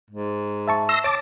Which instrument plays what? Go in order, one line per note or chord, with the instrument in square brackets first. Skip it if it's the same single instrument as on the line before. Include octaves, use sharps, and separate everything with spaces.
[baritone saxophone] G#2
[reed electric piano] E5 A5 C#6
[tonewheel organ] C6 E6 A#6
[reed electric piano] C#5 A6 [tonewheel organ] A5 D6